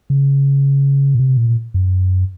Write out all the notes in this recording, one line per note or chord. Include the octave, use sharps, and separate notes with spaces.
C#3
A#2
C3
A#2
F#2